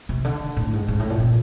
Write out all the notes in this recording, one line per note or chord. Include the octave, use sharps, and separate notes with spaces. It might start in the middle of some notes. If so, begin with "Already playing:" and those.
C3
D3
A2
G#2
G#2
A2
A#2
A#2